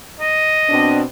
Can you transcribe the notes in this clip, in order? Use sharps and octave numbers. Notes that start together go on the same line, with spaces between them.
D#5
B2 C4 D4